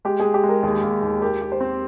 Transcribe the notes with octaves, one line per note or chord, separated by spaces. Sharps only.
G#3 G4
G#4
G#3
G4
G#3
A#4
D#2 G#4
D#2
D#2
G4 A#4
G4
C5
C4